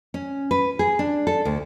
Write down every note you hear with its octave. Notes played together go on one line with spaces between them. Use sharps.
C#4
B4
G#4
D4
A4
D2